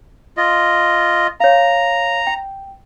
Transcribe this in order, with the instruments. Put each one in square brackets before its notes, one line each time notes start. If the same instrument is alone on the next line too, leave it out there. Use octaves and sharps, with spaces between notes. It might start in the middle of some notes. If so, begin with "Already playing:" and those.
[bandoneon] F4 D#5
[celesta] C#5 F5 [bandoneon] A#5
[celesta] G5